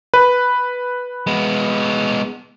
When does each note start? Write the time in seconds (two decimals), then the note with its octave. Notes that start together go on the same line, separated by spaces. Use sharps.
0.14 B4
1.27 G#3 B3